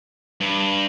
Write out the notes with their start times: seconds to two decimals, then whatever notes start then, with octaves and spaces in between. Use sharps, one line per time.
0.41 G2